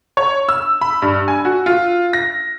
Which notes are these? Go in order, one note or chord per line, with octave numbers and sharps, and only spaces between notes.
C#5
E6
B5
G2
G#5
F#4
F4
A#6